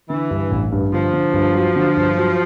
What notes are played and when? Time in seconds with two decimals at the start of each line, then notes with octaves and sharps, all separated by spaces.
0.09 D3 E3
0.30 G2
0.51 A1
0.72 G2
0.93 D3 F3
1.13 D3
1.33 G2
1.55 F#3
1.76 D3
1.97 G2
2.17 F#3